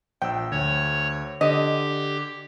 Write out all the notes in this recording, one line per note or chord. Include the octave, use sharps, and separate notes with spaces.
A#1 G5 E6
D2 C#5
D3 G4 D#5